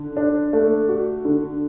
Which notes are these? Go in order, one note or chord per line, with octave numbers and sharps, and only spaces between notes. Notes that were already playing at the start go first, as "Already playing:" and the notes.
Already playing: D3
D4
A3
F#4
D3